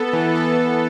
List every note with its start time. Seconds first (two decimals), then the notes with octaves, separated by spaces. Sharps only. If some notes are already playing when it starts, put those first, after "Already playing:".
Already playing: B3 A4
0.13 E3
0.35 A4
0.58 E3